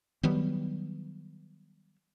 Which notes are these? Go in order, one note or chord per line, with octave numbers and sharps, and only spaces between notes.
D#3 F#3 G3 B3